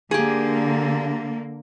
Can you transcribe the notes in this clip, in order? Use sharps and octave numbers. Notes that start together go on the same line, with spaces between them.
D3 A#3 G4 G#4